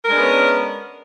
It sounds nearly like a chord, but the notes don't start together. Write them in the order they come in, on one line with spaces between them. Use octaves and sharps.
A#4 G#3 D4 B3 C#4